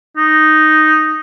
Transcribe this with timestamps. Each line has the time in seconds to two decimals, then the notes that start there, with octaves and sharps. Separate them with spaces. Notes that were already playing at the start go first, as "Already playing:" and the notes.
0.17 D#4